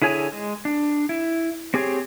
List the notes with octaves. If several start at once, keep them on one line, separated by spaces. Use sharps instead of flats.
D3 E4 G#4 C#5 G#5
G#3
D4
E4
C4 G4 G#4 C#5